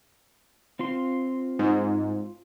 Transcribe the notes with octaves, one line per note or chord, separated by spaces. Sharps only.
C4 F4 C6
G#2